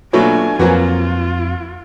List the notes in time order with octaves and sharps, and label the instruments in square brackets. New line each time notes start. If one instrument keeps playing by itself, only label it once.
[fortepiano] B2 F#3 A3 [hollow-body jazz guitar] A#3 F4 C#5 [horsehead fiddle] D4 G#5
[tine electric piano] F2 [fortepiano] F#3 A#3 F#4 [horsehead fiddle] F4 [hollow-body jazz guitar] B4 C5 G#5